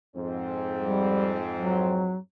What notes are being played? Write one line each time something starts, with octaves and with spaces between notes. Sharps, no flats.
F2 G#2 C4
G3
F#3